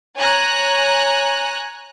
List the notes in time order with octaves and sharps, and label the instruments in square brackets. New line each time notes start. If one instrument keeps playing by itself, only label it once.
[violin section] C#5 G#5 A#5 F#6